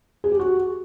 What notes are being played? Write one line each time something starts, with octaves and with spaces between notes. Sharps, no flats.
G#4
G4
F#4